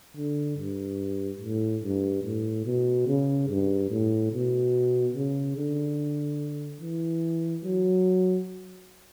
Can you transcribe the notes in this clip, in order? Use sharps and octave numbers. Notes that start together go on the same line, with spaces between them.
D3
G2
A2
G2
A2
B2
C#3
G2
A2
B2
C#3
D3
E3
F#3